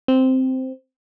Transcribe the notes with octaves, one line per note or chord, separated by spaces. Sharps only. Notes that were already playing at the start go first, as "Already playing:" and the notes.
C4